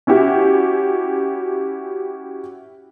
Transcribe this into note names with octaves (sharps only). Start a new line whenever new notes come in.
C#4 E4 F#4 G4